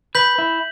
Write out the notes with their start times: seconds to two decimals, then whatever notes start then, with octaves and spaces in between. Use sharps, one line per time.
0.15 B4 G6 B6 F#7
0.38 E4